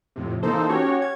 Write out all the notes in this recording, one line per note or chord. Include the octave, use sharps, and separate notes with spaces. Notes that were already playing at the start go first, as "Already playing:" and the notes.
F2 A2 C3
E3 A#3 D#4 A4 C5
C#4 F#4 G4 C#5
G#6